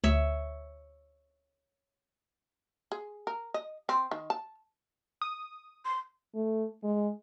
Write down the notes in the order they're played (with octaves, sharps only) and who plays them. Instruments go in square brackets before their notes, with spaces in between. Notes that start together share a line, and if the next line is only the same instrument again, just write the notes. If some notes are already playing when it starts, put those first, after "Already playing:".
[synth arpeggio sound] D2 [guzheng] C#5 E5
[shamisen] G#4
A#4
D#5
C4
D#3
A5
[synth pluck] D#6
[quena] C6
[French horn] A3
G#3